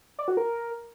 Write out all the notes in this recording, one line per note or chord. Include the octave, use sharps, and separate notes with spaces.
D5
F#4
A#4